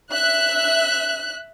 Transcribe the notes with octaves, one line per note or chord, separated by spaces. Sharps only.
E5 F#6